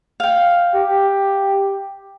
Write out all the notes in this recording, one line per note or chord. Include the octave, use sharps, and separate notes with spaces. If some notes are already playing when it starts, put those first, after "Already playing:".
F5 G5
G4